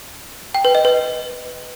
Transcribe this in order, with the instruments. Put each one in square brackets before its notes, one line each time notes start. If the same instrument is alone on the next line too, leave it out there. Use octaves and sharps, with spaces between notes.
[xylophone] G5
B4
D#5
B4